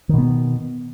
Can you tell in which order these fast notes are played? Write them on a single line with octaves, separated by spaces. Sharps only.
D#3 B2 B3